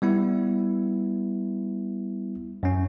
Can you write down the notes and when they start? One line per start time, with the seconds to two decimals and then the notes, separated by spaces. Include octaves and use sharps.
0.02 G3 B3 E4
2.63 F#2 C#4